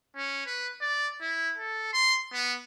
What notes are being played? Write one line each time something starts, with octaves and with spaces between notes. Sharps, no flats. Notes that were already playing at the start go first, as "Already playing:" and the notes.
C#4
B4
D5
E4
A4
C6
B3